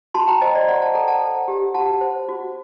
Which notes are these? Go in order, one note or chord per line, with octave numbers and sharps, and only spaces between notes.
F#4 A5 C6
G5 A#5
C5 D#5 G5
D5
C5 D5 F#5
F#5 A5
A4 G5 A#5
F#5 A5
C5
G4
F#4 F#5 A5
C5
F#4